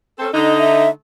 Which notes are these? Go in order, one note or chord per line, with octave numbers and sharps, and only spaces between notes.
C4 C#4 A4
D3 D#4 D#5
E5